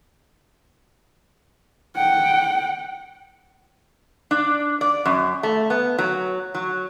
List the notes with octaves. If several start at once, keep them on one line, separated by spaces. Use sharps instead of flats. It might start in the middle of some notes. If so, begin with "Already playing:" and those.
F#5 G5
D4
D5
F#2
A3
B3
F#3
F#3